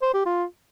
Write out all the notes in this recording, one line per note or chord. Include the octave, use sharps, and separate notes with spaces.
C5
G4
F4